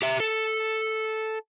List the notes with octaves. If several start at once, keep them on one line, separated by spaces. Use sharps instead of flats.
G4 E5
A4